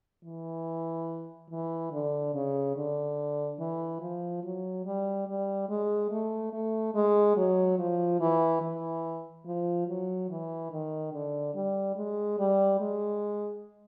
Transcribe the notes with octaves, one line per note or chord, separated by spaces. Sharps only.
E3
E3
D3
C#3
D3
E3
F3
F#3
G3
G3
G#3
A3
A3
G#3
F#3
F3
E3
E3
F3
F#3
E3
D#3
D3
G3
G#3
G3
G#3